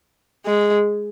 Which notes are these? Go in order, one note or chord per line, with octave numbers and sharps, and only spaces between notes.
G#3